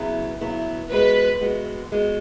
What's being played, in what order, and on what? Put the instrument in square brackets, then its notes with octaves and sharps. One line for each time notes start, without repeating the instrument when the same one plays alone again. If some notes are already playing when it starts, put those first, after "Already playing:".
Already playing: [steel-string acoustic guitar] C#3 F#3 B3 E4
C#3 F#3 B3 E4
[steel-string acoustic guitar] G#3 B3 F#4 [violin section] B4
[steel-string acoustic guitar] G#3 B3 F#4
G#3 B3 F#4